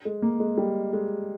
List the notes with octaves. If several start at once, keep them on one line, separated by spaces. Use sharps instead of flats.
G#3
A#3
G#3
G3
G#3